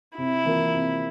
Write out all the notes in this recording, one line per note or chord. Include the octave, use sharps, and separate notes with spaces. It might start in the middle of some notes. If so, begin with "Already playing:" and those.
C3 E4
E3 A#3 F4 A#4
C3